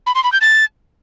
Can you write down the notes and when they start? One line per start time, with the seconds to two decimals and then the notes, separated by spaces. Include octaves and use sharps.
0.06 B5
0.15 C6
0.24 B5
0.32 G6
0.41 A6